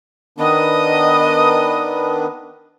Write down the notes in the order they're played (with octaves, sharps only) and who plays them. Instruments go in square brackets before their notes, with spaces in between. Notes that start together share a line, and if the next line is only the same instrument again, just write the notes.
[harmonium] D#3 B3 D4 [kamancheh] D#5 D#6